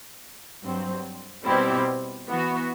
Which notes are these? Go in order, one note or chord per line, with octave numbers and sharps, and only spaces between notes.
G2 F#3 C4
B2 G3 C4 E4 G4
E3 B3 F#4